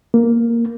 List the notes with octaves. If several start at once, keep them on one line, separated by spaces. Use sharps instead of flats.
A#3